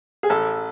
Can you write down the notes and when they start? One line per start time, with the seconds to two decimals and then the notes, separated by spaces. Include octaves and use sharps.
0.23 G#4
0.30 A1 A4